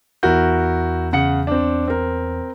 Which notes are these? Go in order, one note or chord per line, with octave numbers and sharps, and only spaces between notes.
E2 E4 F#4 A#4 G6
C#3 F#5 C#7
C4 D4
C4 A#4